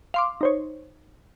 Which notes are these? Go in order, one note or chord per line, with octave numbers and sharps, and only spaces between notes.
F5 C6 D6
D#4 C5 C#5